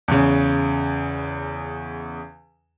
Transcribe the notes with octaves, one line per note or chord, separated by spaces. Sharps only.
E2 C#3